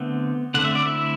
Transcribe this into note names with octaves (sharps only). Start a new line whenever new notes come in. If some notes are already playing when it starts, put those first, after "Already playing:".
Already playing: D3 A3 B3 C4
D3 A3 C4 F#5
E5
D5
E4 E5